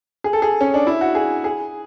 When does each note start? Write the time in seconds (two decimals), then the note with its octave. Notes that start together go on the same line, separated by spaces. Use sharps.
0.24 G#4
0.33 A4
0.42 G#4
0.61 C#4
0.74 D4
0.87 E4
1.01 F#4
1.15 G#4
1.44 G#4